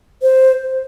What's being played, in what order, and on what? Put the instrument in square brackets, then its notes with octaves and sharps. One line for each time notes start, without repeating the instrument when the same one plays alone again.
[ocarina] C5